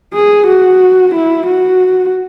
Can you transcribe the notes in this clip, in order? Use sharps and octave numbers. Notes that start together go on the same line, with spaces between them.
G#4
F#4
E4
F#4